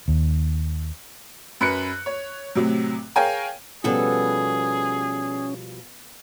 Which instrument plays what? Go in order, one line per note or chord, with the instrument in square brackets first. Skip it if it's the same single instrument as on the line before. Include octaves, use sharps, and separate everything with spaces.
[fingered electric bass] D#2
[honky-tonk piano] F#2 B4 F#6 C#7
C#5
A2 C3 F#3
G#4 A#4 C#5 F5 G5 G#5
[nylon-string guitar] B2 F3 G3 [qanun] B3 A4 [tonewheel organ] C#4 [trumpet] G#4